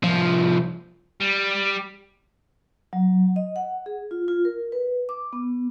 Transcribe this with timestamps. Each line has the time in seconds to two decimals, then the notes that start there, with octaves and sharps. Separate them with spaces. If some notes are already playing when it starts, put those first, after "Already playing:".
0.04 C2 F3
1.21 G3
2.93 F#3
3.36 D#5
3.56 F#5
3.86 G#4
4.11 F4
4.28 F4
4.45 A#4
4.72 B4
5.09 D6
5.33 B3